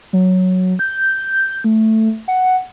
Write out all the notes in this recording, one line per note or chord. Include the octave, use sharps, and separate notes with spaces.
F#3
G6
A3
F#5